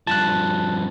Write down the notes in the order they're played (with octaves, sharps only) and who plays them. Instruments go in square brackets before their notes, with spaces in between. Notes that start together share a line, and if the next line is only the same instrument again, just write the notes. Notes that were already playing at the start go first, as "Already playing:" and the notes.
[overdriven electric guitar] G2 F3 [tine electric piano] A5 F#6